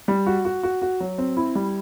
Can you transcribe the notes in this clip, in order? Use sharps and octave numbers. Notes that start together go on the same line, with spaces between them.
G3
F#4
F#4
F#4
F#4
F#3
C4
E4
G3